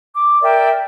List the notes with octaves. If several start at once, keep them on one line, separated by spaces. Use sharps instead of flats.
D6
A#4 D5 E5 G5